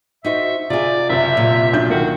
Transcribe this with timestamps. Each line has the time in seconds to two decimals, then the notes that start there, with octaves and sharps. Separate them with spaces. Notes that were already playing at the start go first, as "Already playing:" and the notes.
0.25 D#4 F#4 C5 E5
0.70 C3 F4 G#4 D5
1.09 F#1 C3 E5
1.37 A#2
1.73 B1 D4 G6
1.90 D#3 A#3 F#4